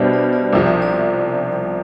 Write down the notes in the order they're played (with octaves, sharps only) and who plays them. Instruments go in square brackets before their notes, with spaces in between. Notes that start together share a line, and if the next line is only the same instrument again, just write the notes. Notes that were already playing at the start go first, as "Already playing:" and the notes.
Already playing: [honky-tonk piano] B2 G3 D4 G4 [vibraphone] B4 C5 D5 E5
[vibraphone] D5
D5
[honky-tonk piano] C2 C3 F3 [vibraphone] D5
[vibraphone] E5
D5